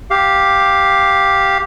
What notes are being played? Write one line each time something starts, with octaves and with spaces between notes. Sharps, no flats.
G4 F5